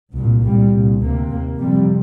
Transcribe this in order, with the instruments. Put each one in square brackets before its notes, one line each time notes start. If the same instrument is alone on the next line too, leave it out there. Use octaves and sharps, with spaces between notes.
[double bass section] C2 A#2
C2 A#2 G3
C2 A#2
D2 C3 A#3
D#2 A#3
F2 C3 G3